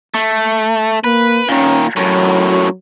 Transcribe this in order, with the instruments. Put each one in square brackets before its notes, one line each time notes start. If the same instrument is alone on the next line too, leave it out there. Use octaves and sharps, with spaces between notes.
[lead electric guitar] A3
[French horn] A#3 [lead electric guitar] B4
[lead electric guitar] A#2 D#3 [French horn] C#4
[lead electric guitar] F#2 A2 [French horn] F#3